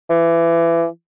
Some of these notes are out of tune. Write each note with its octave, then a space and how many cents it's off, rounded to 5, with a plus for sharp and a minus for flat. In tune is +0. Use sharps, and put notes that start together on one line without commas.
E3 +25